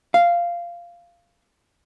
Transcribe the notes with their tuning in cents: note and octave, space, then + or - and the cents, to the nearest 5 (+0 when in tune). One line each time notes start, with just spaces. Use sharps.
F5 -10